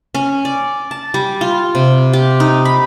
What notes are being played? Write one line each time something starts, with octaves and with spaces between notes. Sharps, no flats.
C#4
D5
A5
G3
F4
C3
G4
D#4
B5